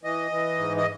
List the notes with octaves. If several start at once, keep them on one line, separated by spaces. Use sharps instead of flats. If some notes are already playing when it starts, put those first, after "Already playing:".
E3 D#5
E3
G#2
D#5